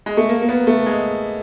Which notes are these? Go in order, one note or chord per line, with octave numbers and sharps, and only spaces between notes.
G#3
A3
A#3
A#3
B3
A3
G#3